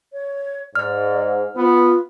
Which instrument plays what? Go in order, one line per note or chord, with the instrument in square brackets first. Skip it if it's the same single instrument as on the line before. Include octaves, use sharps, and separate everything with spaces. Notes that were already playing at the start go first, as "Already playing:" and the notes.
[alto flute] C#5
[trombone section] G#2 [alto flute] D5 [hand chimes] F6
[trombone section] B3 [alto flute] F4